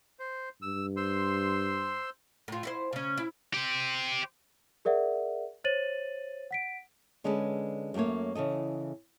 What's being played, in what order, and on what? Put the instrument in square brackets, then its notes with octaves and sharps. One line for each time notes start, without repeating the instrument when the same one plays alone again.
[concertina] C5
[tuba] G2 [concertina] E6
[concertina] C5 C6 E6
[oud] A2 F4
E4 F#4 C5
C#3 C#4
E4
[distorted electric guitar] G4 C5
[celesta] G#4 A#4 D5 E5 F#5
C5 C#5 A6 D#7 F#7
F#5 B6 D7
[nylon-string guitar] D3 G#3 C#4 G#4 A4 B4
F#2 F#3 A3 A#3 C#5
C#3 E3 A4 D#5